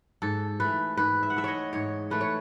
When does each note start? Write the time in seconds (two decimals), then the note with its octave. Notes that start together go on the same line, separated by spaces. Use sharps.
0.22 G#2 A4
0.60 E3 A3 B4
0.97 G#2 B4
1.23 E5
1.30 F#5
1.36 E3 A3 E5
1.44 C#5 D#5
1.73 G#2 C#5
2.10 E3 A3 B4
2.21 C#5